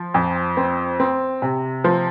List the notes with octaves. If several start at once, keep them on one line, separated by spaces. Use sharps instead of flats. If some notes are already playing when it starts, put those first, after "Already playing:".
Already playing: F3
F2
C4
C4
C3
F3